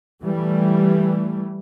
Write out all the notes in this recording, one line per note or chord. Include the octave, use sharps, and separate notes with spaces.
E3 G3 A3